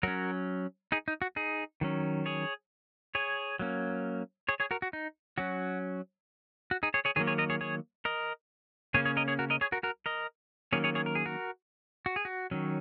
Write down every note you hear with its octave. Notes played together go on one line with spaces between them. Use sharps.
F#3 C#4 F#4 A#4
D#4 G#4
D#4
F#4
D#4 G#4
D#3 F#3 C#4
G#4 C#5
G#4 C#5
F#3 A#3 C#4
G#4 C#5
G#4 C#5
F#4 A#4
F#4
D#4
F#3 C#4 F#4
F#4
D#4 G#4
G#4 C#5
G#4 C#5
D#3 F#3 A#3 G#4 C#5
G#4 C#5
A#4 D#5
G#4 C#5
G#4 C#5
A#4 D#5
C#3 A#3 C#4 G#4 C#5
G#4 C#5
A#4 D#5
G#4 C#5
F#4 A#4
A#4 D#5
G#4 C#5
F#4 A#4
F#4 A#4
A#4 D#5
D#3 F#3 A#3 C#4 G#4 C#5
G#4 C#5
G#4 C#5
A#4
G#4
F#4 A#4
F#4
G#4
F#4
D#3 F#3 C#4